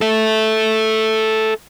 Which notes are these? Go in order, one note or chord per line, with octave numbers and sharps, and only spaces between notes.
A4 E5